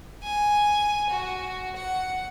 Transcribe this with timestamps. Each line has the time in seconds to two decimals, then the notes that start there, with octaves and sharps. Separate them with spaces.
0.24 G#5
1.10 F#4
1.76 F#5